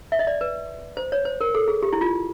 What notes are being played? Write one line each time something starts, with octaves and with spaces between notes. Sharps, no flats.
E5
D#5
D5
B4
C5
C#5
C5
A#4
A4
G#4
G4
E4
F4